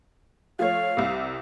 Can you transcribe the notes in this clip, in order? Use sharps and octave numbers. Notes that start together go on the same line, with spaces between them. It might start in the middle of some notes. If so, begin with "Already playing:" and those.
F3 A3 C#5 F5
C2 C3